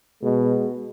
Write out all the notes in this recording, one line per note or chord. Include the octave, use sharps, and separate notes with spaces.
B2 G#3